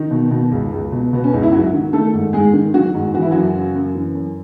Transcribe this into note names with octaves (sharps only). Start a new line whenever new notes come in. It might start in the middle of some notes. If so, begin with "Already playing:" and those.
Already playing: D#3 D#4
B2
B2
C#2
C#2
B2
B2 B3
C#4
C#2 D#4
E4
G#2 F#3 F#4
D#3
D#3 A3 A4
G#2
G#2 G#3 G#4
D#3
D#3 F#3 F#4
G#2
E3 F#4
E4
F#2 F#3 F#4
C#3
F#2
E3
F#2